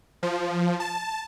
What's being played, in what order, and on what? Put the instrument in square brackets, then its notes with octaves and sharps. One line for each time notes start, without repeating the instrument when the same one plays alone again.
[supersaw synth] F3
A5